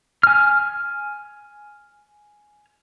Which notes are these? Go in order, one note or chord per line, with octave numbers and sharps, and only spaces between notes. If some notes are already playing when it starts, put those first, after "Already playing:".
G#5 F6